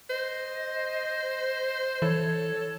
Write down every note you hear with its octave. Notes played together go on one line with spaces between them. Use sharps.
C5 D#5
E3 A4 C#5